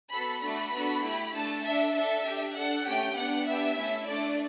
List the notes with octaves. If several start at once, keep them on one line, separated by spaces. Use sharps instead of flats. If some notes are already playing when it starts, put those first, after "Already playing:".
B3 F#4 A4 B5
A3 D4 F#4 A4 B5
B3 D4 F#4 A4
A3 E4 G4
A3 D4 A4 A5
D4 A4 E5
D4 A4 E5
D4 G4
D4 A4 F#5
A3 C#4 G4 G5
B3 D4 G4 F#5
B3 D4 G4 E5
A3 C#4 E4 A4
A3 D4 A4 D5